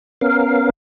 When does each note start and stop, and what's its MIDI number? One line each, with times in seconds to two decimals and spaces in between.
0.21 0.70 59
0.21 0.70 61
0.21 0.70 70
0.21 0.70 77